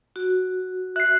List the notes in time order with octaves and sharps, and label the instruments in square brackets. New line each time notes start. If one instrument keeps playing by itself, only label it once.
[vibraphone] F#4
[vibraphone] E5 [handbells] F#6 C7